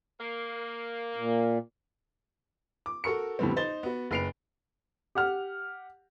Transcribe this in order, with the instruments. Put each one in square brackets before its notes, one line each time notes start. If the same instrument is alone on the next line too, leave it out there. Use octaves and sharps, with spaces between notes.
[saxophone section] A#3
[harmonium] A#2
[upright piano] D6
F#4 A4 A#4 C#6 C#7
F2 A2 D3 G3 B3 C4
D#4 C5 A6 G7
B3 F#4
F#1 B4 C7 D7 F7
G4 F#5 F6